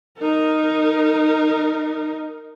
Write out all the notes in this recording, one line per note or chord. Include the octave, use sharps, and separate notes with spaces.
D#4 A#4